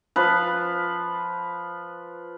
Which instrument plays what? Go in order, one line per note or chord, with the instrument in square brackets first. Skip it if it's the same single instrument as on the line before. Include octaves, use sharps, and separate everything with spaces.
[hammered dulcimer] F3 B4